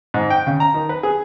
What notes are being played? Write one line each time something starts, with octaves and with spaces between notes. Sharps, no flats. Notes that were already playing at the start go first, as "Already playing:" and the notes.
G#2
G5
C#3
A#5
D#3
B4
G#4